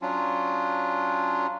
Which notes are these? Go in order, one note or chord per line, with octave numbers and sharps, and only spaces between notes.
F#3 C#4 D4 F4